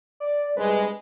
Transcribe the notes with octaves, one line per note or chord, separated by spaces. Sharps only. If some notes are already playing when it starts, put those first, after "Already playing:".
D5
G2 C3 G#3 B4